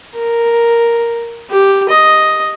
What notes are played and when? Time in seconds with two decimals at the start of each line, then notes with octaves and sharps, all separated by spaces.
0.16 A#4
1.50 G4
1.89 D#5